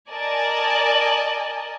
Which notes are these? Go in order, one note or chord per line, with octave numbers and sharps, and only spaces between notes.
A#4 D5 D#5 G#5 A5